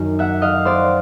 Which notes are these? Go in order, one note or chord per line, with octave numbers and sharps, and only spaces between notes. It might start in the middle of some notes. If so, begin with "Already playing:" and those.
Already playing: F#2 D#3
E5 F#5
D#5 F5
C5 D5